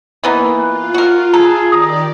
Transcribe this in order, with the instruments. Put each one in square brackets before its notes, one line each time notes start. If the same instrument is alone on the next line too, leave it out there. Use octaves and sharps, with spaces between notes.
[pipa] E3 B3 D#4 [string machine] A#3
[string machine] F4 [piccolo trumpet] F#6
[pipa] F#4 A#4
[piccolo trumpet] G#4 [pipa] A4 [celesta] A#5
[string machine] D#3 G4 D5 [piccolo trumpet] A#5 [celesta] D#6